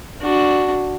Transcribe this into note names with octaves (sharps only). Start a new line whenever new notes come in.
D4 F#4